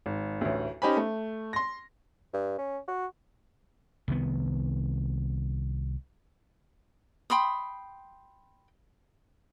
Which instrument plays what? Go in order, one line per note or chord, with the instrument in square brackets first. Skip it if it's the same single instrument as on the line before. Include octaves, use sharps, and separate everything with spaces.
[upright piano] G#1
A1 D2
C#4 D#4 G4 C5 G#5 B5
A3
C6 A#6
[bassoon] G2
C#4
F#4
[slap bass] C2 D#3 B3
[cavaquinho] G5 B5 C6 D#6